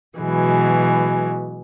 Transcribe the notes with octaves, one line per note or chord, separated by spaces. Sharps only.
B2 E3 F#3 G#3